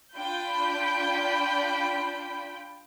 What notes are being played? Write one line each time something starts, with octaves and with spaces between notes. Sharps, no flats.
D4 F4 G5 B5 G6